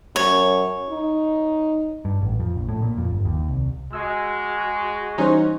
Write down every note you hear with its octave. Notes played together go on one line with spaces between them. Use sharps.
F#2 C#5
D#4
G2
A1
F2
A#1
A2
A#2
F2
G1
D#2
C2
G#3 F#4 E6
E3 G3 C#4 D#4 F#4 C5